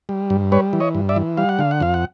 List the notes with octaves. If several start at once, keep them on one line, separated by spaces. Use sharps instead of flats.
G3
G2
G3 B4 C#5
E3
C#5 D#5
G2
D5 E5
E3
G3 F5
F#5
D3 F5
F#5
F2 F5
F#5